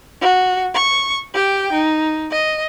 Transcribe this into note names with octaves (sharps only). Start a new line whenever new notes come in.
F#4
C#6
G4 G5
D#4
D#5